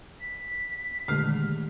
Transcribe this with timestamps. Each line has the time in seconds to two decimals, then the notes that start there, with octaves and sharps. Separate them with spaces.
0.20 B6
1.08 A#2 D3 D#3 G#3 A3 G4 F6